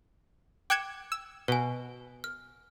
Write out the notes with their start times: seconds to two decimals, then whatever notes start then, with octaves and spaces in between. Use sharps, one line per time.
0.70 G5 D6 F#6 G#6 C#7 E7
1.12 E6
1.48 B2 B4 G#5
2.24 F6